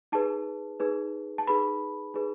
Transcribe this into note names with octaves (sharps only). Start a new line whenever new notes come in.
D#4 G#4 B4 A5
D#4 G#4 B4
A5
D#4 G#4 B4 B5
D#4 G#4 B4